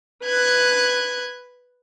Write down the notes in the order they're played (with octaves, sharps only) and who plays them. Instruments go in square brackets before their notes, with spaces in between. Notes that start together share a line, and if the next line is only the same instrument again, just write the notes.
[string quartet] B4 F#6 G#6